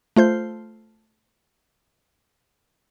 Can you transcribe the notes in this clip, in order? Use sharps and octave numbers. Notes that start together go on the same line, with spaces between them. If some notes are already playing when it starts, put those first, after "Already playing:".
A3 F4 C5 G6